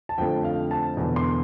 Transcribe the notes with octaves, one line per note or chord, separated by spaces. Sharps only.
A5
F2 D3 F3 A3 G5
F5
A5
E1 E2 D3
C6